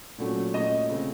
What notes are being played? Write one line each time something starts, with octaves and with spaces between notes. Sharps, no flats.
A#2 F#3 A3 C#4
A#2 A3 C#4 D#5
C#3 A3 C4